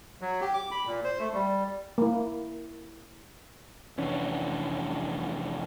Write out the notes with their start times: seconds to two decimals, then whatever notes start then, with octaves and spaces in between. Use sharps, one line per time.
0.21 F#3
0.41 G4
0.54 D6
0.71 B5
0.87 A#2
1.04 C5
1.19 A3
1.34 G3
1.98 A#3 E4
3.98 F1 E3 C#4 D4